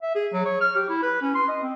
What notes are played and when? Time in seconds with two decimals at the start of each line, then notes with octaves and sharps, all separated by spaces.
0.02 E5
0.15 G#4
0.33 F#3
0.45 C#5
0.61 F6
0.75 G4
0.89 E4
1.02 B4
1.22 C#4
1.35 C6
1.48 D#5
1.63 C4